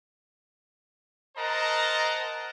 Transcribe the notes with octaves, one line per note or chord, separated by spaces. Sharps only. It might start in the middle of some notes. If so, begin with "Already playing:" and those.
A#4 C5 D#5 F#5 A5 A#5